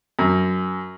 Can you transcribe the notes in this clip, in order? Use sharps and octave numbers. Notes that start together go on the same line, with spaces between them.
F#2